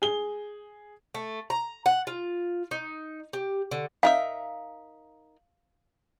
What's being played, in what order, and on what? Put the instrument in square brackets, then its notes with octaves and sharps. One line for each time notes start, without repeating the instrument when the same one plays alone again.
[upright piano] G#4 G7
[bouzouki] A3
A#5
F#5
F4
D#4
G4
D3
[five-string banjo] D#4 A#4 E5 [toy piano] F5